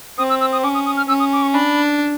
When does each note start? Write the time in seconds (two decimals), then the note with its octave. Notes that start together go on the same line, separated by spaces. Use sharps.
0.18 C4 D#6
0.30 E6
0.41 E6
0.53 D#6
0.63 C#4 D6
0.74 D#6
0.86 D#6
0.97 F6
1.08 C#4 E6
1.20 D#6
1.33 D6
1.42 C#6
1.54 D4 B5